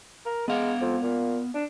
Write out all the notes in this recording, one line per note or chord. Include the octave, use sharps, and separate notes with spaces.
A#4
G#3 B3 F5 F#5
F2
A#2
D4